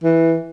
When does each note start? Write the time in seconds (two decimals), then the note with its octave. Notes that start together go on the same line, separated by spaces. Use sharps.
0.04 E3